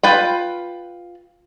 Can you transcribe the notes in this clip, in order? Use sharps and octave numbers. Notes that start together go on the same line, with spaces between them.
F4 B4 G5